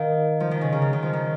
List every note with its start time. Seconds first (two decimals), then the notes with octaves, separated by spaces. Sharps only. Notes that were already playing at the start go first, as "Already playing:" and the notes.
Already playing: D#3 A#4 F5
0.40 F3
0.51 D#3
0.61 C#3
0.72 C#3
0.82 D#3
0.93 D#3
1.03 F3
1.13 D#3